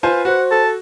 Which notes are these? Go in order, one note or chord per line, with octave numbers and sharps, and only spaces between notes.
F4 B4 C5 G#5
F#4 C5 F#5
A4 A5